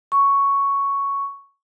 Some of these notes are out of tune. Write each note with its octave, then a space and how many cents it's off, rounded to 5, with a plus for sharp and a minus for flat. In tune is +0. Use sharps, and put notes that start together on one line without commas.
C#6 +5